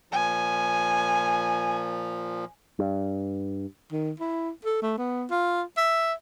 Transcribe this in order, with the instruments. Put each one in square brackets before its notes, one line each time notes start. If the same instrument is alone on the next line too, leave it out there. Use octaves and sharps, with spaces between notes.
[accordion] A#2 F3 [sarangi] G#5
[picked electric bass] G2
[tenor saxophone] D#3
E4
A4
A3
B3
F4
E5